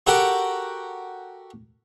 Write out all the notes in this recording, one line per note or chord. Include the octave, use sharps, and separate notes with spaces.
F#4 G4 A4 A#4 F#5 G5